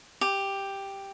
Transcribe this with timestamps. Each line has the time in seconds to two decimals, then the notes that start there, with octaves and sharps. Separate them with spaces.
0.21 G4